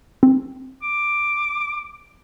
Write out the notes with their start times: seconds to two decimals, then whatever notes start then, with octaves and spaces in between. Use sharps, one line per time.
0.23 C4
0.82 D6